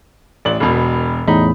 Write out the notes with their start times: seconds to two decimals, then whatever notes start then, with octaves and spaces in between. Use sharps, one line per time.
0.45 A1 D5 F#7
0.60 E1 B2
1.27 E2 A2 D#4 B5